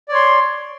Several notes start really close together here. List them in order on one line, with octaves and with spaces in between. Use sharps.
D5 C#5 C6